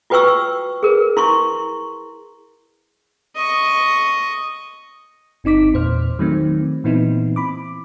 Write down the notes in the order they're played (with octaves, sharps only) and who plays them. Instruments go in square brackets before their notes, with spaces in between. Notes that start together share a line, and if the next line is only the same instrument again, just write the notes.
[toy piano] F4 F#4 B4 G5 C#6 E6
G#4 A#4 B4
E4 C6 C#6
[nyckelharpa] D#5 C#6
[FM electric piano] G1 C4 D#4 D6 B6
E2 A#2 C5 F6
D#3 F#3 A3 C4
A#2 E3 B3 C4 D#4 E4
B5 D6